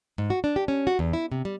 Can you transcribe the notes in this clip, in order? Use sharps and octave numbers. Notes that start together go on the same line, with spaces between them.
G#2
F#4
D4
G4
C#4
F#4
E2
E4
C3
G3